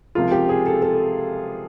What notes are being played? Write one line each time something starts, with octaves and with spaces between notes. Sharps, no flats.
C#2 C3 F3 A#3 F4
G4
G#4
A4
A4